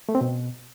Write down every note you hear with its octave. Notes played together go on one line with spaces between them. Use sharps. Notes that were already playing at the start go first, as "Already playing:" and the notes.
A3
C4
B2